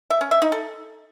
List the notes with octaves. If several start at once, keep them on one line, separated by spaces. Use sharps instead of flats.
E5
C#4
E5
D#4
A4